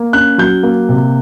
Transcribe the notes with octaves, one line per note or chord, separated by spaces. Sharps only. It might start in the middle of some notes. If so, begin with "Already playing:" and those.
Already playing: A#3
C#4 F#6
F#3 G6
A#3
C3